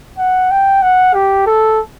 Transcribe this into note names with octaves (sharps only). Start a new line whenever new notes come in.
F#5
G5
F#5
G4
A4